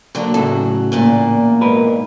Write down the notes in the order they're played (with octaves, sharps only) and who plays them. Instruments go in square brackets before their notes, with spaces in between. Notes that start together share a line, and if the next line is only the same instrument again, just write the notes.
[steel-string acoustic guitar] D3 F#3 A#3
[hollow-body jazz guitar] A2 C#3 A4 [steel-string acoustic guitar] F#3
[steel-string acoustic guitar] E2 A#2 A#3
[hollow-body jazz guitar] G#2 A#4 B4